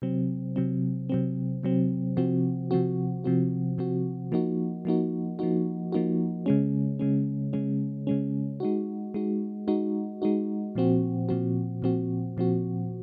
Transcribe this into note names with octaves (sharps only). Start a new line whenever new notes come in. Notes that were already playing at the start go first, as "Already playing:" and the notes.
C3 F#3 C4
C3 F#3 C4
C3 F#3 C4
C3 F#3 C4
C3 F3 C4 F#4
C3 F3 C4 F#4
C3 F3 C4 F#4
C3 F3 C4 F#4
F3 A#3 D#4 F#4
F3 A#3 D#4 F#4
F3 A#3 D#4 F#4
F3 A#3 D#4 F#4
C#3 G#3 C#4
C#3 G#3 C#4
C#3 G#3 C#4
C#3 G#3 C#4
G#3 D#4 F#4
G#3 D#4 F#4
G#3 D#4 F#4
G#3 D#4 F#4
A#2 F3 C4 F#4
A#2 F3 C4 F#4
A#2 F3 C4 F#4
A#2 F3 C4 F#4